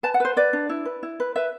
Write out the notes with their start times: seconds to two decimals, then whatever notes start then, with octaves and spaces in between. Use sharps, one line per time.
0.03 B4 A5
0.14 F#5
0.20 B4 C5
0.37 B4 D5
0.53 D4
0.69 E4
0.85 B4
1.03 E4
1.20 B4
1.36 B4 E5